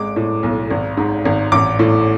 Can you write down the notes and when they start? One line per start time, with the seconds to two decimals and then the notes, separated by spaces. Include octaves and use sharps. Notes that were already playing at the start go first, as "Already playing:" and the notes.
Already playing: G#1 G#3 D6
0.16 A2
0.43 B1
0.70 G#1
0.97 G#2
1.25 G#1
1.52 A1 D6
1.79 A2